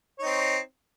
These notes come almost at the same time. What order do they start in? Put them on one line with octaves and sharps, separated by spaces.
C#5 D#4 C4